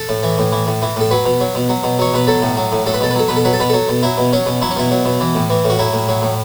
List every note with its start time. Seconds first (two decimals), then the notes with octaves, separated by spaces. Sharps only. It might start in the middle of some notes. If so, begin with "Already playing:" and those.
Already playing: A4
0.09 A2
0.23 E3
0.38 A2
0.52 E3
0.67 A2
0.82 E3
0.96 A2 A4
1.11 F#3 B4
1.26 B2
1.41 F#3
1.55 B2
1.69 F#3
1.84 B2
1.98 F#3 C#5
2.14 B2 B4
2.27 F#3 A4
2.42 A2
2.57 F#3
2.72 A2
2.86 F#3 A4
2.94 B4
3.01 B2 A4
3.11 B4
3.15 F#3 A4
3.28 B2 B4
3.36 A4
3.45 F#3 B4
3.53 A4
3.60 B2 B4
3.70 F#3 A4
3.89 B2
4.03 F#3 E4
4.18 B2
4.33 F#3 C#4
4.46 B2
4.62 F#3 E4
4.71 C#4
4.76 B2 E4
4.91 F#3
5.05 B2
5.21 E3
5.35 A2
5.50 E3
5.65 A2
5.70 F#4
5.79 F#3 E4
5.93 A2
6.08 F#3
6.22 A2